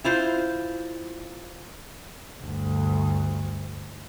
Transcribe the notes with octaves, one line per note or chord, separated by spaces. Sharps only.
E4 F4 C5
D2 G2